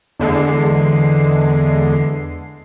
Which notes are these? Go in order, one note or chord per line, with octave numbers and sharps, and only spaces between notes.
E2 D3 G#3 C7